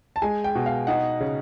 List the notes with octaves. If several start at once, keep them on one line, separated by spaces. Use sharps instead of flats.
A5
G#3 G#5
G5
B2
F5
D#4 F#5
C#3